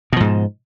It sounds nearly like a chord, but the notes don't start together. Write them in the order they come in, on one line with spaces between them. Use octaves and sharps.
B2 F3 G#2